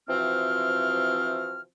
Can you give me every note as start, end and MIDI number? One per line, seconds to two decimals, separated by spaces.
0.09 1.61 48
0.09 1.61 52
0.09 1.61 53
0.09 1.61 60
0.09 1.61 66
0.09 1.61 89